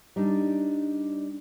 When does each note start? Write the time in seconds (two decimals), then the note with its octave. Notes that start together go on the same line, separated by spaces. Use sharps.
0.16 G3 D4 D#4